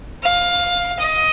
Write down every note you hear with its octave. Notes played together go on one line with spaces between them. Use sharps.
F5
D#5